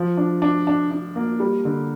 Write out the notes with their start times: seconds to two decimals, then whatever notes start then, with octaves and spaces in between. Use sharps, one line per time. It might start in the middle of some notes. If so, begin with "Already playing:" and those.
Already playing: F3
0.17 D4
0.42 D4
0.67 D4
0.91 D4
1.16 A#3
1.40 G3
1.65 D3